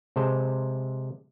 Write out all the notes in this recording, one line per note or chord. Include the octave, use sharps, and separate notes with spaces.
C3 G#3 C5 A5